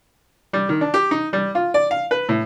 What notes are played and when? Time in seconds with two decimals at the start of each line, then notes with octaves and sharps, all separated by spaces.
0.53 G3
0.69 D#3
0.81 D4
0.94 G4
1.11 D#4
1.33 G3
1.55 F4
1.74 D5
1.91 F5
2.11 B4
2.29 A2